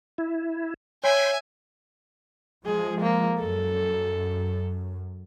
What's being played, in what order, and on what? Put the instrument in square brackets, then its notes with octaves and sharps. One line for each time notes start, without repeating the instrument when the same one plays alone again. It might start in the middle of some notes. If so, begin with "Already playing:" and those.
[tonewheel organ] E4
[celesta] C#5 [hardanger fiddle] E5 G#5 [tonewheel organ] G5 B5 C6
[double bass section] F3 G#3 [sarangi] G#4
[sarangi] A#3
[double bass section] F#2 [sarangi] A4